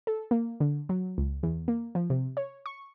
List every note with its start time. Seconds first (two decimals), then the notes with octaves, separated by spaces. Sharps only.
0.07 A4
0.31 A#3
0.60 D3
0.89 F#3
1.18 C#2
1.43 E2
1.68 A#3
1.95 F3
2.10 C3
2.37 C#5
2.66 C#6